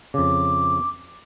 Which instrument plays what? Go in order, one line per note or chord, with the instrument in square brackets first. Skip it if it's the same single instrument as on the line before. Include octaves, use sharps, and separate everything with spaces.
[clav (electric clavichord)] F2 C#3 [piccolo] D6